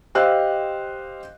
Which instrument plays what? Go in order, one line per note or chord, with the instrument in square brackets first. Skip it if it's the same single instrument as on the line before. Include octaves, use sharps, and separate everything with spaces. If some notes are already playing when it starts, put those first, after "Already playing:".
[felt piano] G4 C5 D#5 F5 E6 F#6